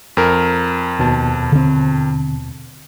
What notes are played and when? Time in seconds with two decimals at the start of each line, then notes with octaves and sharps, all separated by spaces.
0.17 F2 A#4
0.99 D#2 B2 A5
1.52 D3 C4